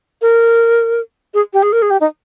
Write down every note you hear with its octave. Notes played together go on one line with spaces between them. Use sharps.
A#4
G#4
G4
G#4
A#4
G#4
G4
D#4